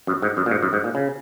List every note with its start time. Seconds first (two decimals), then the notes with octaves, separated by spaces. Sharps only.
0.07 F#2
0.22 G#2
0.37 F#2
0.46 A#2
0.51 G#2
0.62 F#2
0.73 G#2
0.84 A#2
0.95 C#3